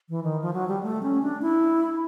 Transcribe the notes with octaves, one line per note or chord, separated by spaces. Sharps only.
E3
D#3
F3
F#3
G3
A3
C#4
D4
E4